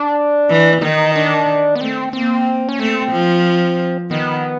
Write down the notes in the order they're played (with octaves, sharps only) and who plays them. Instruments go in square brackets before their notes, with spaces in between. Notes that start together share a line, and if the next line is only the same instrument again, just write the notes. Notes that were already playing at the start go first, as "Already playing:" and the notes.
Already playing: [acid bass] D4
[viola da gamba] E3
[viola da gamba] D#3 [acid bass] D#4
[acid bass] D4
B3
[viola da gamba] A3 [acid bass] C4
[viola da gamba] A#3 [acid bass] C4
[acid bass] C#4
[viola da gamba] A3 [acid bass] C4
[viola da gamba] F3
[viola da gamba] D#3 [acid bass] B3